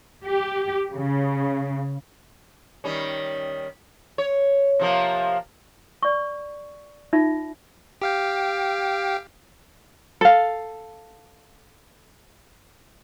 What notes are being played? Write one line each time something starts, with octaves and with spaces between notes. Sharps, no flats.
G4
C#3
D#3 G3 C#4
C#5
C3 F3 A#3
D5 C#6
D#4 F4 E5
G4 F5 G5
A4 F5